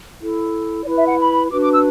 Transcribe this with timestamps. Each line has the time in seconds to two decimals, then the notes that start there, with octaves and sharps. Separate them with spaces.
0.20 E4 A4
0.85 E4 B4 D5
0.96 E5
1.07 F#5
1.18 B5
1.50 D4 F#4 B4 D6
1.61 D6
1.73 E6